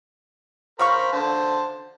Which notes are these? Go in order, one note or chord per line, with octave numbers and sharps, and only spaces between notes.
C#3 A#4 C5 F5 B5 C#6
D3 C5 A5